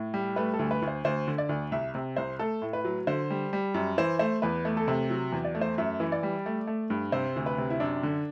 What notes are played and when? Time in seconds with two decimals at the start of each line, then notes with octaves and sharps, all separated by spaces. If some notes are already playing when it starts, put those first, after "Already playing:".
Already playing: A2
0.14 G3
0.36 A3 B4
0.54 A4
0.59 D2
0.71 B4
0.82 D2
0.88 C5
1.05 D2 C5
1.28 D3
1.38 D5
1.49 D2
1.72 C2 E5
1.95 C3
2.17 C2 C5
2.39 A3 A4
2.62 A2
2.73 B4
2.85 F#3
3.07 D3 C5
3.30 G3
3.53 G3
3.74 F#2
3.98 E3 C5
4.19 A3 C5
4.42 E2 B4
4.65 A3
4.77 A4
4.88 C3
5.10 F#3
5.32 E2
5.45 D5
5.55 A3
5.61 C5
5.78 F#2 E5
6.00 E3
6.12 D5
6.23 G3
6.46 A3
6.67 A3
6.90 G2
7.12 C3 C5
7.36 D2
7.46 B4
7.58 C3
7.70 E4
7.80 F#2 D4
8.03 D3